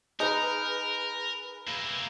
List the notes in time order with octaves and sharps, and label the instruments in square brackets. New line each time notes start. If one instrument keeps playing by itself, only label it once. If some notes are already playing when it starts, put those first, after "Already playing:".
[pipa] D#4 [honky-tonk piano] G#4 B4 [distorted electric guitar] A#4
[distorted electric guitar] A#3 E4